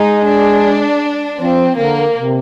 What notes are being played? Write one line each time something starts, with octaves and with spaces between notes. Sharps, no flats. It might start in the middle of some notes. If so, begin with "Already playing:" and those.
Already playing: G#3 D#4
D4
F3 C4
D3 A#3
C3